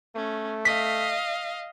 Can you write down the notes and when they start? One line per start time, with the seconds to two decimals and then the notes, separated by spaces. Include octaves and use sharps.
0.16 A3 C#4
0.65 D#5 F5 B6